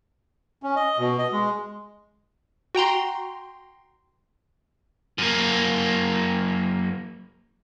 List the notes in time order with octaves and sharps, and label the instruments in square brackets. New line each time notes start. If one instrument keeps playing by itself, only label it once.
[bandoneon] C#4
D#5
B2
D#5
G#3
[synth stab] F#4 G5 A#5 C6
[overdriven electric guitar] F#2 A#3